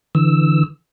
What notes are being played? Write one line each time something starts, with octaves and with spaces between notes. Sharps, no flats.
D3 E3 E6